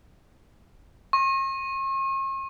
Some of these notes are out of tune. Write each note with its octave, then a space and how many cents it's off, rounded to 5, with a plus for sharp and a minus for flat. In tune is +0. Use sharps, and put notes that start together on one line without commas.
C#6 -45